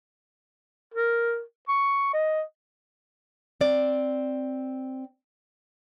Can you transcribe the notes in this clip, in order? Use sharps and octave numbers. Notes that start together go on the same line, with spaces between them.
A#4
C#6
D#5
C4 D5